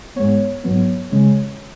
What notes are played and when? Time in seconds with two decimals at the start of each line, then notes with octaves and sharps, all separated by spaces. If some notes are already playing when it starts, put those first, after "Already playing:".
0.16 G#2 G#3 B3 C#5
0.64 G#2 F#3 B3
1.12 C#3 G#3 C#4